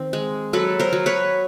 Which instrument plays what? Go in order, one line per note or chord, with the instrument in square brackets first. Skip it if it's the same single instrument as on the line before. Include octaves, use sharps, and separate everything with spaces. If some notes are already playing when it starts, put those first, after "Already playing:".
Already playing: [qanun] D#3 C4
G#3
F#3 A4 B4
A#4 C5
F#3
B4 C#5